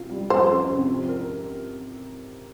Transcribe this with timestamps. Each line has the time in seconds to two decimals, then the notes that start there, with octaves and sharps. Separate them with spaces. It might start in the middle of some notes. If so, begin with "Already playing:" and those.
Already playing: C3 F4
0.11 G3
0.30 F2 C5
0.50 C#4
0.69 C3
0.88 F3
1.09 A#4